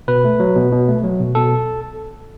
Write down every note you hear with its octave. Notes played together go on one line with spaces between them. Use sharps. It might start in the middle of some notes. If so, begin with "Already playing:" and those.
B2 B4
A3
F#3
B2
B2
A3
F#3
B2
B2 A4